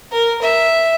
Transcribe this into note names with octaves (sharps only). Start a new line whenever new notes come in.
A#4
E5